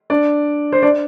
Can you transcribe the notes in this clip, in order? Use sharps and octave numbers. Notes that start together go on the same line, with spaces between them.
D4 D5
C5
D4 D5